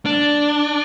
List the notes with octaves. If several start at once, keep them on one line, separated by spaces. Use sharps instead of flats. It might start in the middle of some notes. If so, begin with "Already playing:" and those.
D4